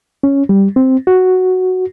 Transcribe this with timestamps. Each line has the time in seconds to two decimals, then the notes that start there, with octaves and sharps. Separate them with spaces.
0.23 C#4
0.49 G3
0.76 C4
1.07 F#4